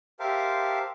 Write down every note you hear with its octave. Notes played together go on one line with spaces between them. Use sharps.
G4 A#4 C5 E5 F5 A5